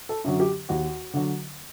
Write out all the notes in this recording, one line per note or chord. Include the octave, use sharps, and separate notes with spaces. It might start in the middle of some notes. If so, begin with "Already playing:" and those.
A4
F#2 D3 F#3
G4
D#2 F#4
D3 F#3